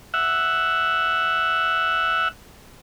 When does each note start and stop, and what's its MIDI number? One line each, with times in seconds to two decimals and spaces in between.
0.14 2.28 76
0.14 2.28 78